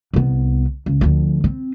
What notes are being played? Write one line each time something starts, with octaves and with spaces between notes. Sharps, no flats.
C2 B3
C#2
D2 F3
C4